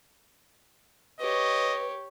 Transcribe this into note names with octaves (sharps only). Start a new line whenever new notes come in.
G4 B4 C#5 D#5